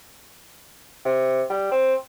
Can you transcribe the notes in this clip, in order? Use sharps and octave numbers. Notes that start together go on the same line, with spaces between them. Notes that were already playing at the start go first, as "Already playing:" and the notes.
C3
G3
C4